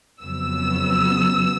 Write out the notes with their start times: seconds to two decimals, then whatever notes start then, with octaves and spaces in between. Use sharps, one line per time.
0.23 F2 C#3 F#3 B3 E6